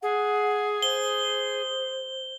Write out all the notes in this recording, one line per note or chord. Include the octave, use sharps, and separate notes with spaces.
G#4 F#5
C5 G7